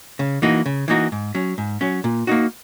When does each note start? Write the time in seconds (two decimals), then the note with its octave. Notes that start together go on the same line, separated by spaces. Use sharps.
0.19 C#3
0.42 E3 A#3 D#4 F#4
0.66 C#3
0.88 E3 A#3 D#4 F#4
1.12 G#2
1.35 F#3 C#4
1.58 G#2
1.81 F#3 C#4
2.04 A#2
2.27 A#3 D#4 F#4